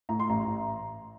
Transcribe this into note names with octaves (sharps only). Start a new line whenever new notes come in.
A2 A#5
C6
A1 A#5